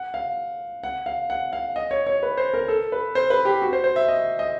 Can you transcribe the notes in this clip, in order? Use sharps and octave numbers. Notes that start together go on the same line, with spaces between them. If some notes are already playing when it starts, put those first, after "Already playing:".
Already playing: F#5
F5
F#5
F5
F#5
F5
D#5
C#5
C#5
B4
C5
A#4
A4
B4
C5
B4
G4
F#4
C5
C5
E5
D#5
D#5